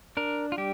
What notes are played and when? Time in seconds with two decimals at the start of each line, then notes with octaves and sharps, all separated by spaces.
0.17 D4 A#4
0.52 F4
0.58 G3 G4